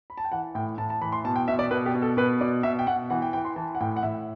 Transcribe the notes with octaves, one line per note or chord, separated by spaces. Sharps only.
B5
A5
G5
E3 F#5
A2 G5
A2 A5
A5
E3 B5
C6
B2 A5
G5
B2 E5
D5
B2 B4
G4
B2
A4
B2 B4
B2 D5
B2 E5
G5
B2 F#5
E3 F#5
G5
E3 G5
C6
E3 A5
F#5
A2 G5
F#5
A2 E5